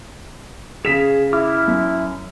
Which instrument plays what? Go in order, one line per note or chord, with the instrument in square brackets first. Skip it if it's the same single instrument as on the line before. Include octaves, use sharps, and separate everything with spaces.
[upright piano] C#3 B6 E7 [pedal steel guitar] G#4
[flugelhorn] E4 [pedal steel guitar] D6 F6
[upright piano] F#2